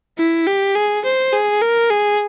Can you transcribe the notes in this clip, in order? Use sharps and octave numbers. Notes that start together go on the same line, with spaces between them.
E4
G4
G#4
C5
G#4
A#4
G#4